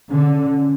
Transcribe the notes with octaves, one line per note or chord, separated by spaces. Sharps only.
D3 C#4